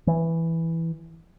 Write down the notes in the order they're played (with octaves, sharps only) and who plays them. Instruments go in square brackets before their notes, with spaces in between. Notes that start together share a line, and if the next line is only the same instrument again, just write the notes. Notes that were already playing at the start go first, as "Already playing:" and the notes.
[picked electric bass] E3